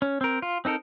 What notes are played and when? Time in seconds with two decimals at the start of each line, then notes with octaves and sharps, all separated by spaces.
0.02 C#4
0.21 C4 A#4
0.42 F4
0.65 C4 D#4 A4 A#4